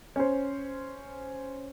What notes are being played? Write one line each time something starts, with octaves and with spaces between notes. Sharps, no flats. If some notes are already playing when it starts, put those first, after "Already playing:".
C#4 C5